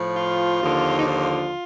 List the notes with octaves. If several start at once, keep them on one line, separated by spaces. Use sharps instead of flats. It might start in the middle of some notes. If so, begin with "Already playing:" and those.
Already playing: A2 F3
F4
D#2 D3 F3
D#4
F4